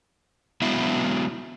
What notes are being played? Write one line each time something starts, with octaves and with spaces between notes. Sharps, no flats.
F#3 G#3 B3 E4 E5 F5